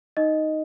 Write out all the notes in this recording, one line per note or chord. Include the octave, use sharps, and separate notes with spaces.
D#4 D#5